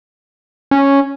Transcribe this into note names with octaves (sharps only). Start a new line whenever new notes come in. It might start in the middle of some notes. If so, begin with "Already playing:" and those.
C#4